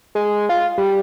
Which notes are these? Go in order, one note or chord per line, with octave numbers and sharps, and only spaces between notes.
G#3
F4
G3